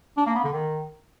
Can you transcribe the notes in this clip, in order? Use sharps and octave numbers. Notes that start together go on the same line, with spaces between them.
D4
A#3
B3
D3
D#3